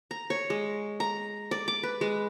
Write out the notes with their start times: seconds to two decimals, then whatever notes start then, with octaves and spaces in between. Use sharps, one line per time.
0.11 A#5
0.30 C#5
0.50 G#3
1.00 A#5
1.51 D5
1.68 D6
1.83 B4
2.01 G#3